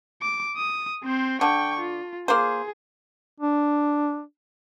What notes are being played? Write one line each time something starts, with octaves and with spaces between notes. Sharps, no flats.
D6
D#6
C4 C5
D3 G5 C#6
F4
A#3 G#4 C5
D4